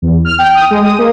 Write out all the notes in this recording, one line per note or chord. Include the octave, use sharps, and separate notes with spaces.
E2
F6
G5
D#6
G#3
D#6
A#3